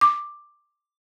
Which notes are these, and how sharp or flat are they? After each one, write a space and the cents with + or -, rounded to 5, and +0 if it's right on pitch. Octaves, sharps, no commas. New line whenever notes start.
D6 +10